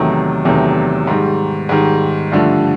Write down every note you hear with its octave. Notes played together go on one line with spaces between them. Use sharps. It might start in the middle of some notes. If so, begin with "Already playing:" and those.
Already playing: E2 C3 D#3 F#3 A3
E2 C3 D#3 F#3 A3
G#2 D#3 G3
G#2 D#3 G3
G2 D3 F3 A3